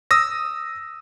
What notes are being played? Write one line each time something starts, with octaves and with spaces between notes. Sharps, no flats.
D#6 E6 A#6